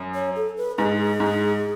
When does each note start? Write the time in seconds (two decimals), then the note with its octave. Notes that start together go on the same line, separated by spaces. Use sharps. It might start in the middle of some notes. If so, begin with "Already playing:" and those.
Already playing: F#2
0.15 C#5
0.36 A4
0.57 B4
0.78 G#2 G#4
1.20 G#2